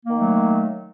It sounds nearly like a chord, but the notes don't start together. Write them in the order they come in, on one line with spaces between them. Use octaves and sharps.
A#3 D#3 A3 F#3